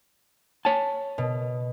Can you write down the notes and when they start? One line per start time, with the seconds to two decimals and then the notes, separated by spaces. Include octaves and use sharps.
0.65 C#5 G#5 A5
1.18 B2